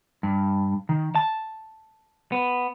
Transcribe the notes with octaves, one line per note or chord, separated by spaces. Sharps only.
G2
D#3
A5
B3